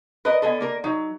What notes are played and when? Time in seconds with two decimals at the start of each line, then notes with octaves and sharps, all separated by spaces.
0.25 A#4 B4 D#5
0.42 D3 B3 A4 D#5 G#5
0.60 A#3 A#4
0.84 F#3 D#4